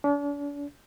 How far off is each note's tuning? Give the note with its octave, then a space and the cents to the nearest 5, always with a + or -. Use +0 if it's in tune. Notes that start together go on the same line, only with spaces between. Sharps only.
D4 -40